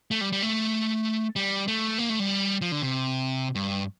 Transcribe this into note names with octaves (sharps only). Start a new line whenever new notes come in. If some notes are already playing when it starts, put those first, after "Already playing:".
A3
G3
G3
A3
G3
A3
A#3
A3
G3
F3
D3
C3
G2